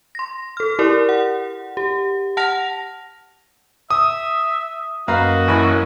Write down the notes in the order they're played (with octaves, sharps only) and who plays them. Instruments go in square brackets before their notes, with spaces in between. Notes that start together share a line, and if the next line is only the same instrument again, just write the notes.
[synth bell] C6 A#6
A4 F6
E4 G4 A#4 D5
F#5
G4
F#5 A5 F6 A#6 F7
[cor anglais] E5 [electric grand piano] D#6
[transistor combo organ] F#2 A#3 D#5 [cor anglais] F#4 [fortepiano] B4 F5 A#5
[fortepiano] A1 E3 B5